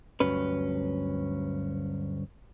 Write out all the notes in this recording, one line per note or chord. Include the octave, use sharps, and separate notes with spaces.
D2 G2 F#3 C#4 B4